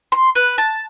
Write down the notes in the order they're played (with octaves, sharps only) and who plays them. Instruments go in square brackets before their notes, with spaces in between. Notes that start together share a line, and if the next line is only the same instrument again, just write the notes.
[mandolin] C6
B4
A5